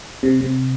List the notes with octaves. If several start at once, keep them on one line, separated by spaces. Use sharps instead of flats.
C3
C3